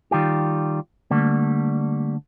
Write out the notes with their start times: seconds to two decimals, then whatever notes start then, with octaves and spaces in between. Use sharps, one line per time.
0.11 D#3 G3 F4 G4
1.11 D3 G3 A3 A#3